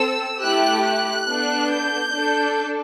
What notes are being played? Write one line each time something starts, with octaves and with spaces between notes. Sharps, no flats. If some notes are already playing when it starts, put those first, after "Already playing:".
Already playing: C4 A4 E6
A3 E4 G4 F#6
F#6
B3 D4 A4
G6
D4 A4